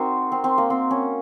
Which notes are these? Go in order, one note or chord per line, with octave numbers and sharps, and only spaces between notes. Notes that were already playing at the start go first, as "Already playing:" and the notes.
Already playing: C4 D#4 F#4 A#4 C5
C4
C4
A#3
C4
C#4